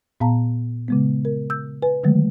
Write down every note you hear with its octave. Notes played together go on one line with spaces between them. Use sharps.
A#2 B3 F5 A5 A#5
C#3 G#3 B3
A#4
E6 G6
B4 G#5
D3 D#3 F#3 G#3 A3